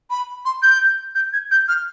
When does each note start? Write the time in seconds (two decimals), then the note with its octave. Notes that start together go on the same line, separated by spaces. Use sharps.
0.10 B5
0.45 C6
0.63 G6
1.15 G6
1.33 G#6
1.51 G6
1.68 F6